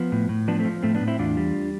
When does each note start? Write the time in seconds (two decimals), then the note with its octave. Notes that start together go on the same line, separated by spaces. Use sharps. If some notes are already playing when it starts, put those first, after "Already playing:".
Already playing: F3 B3
0.12 A2
0.29 A2
0.48 F3 B3 D4
0.59 A3 C4
0.65 F3
0.83 A2 A3 C4
0.95 B3 D4
1.01 A2
1.07 C4 E4
1.19 E2 D4 F4
1.37 G3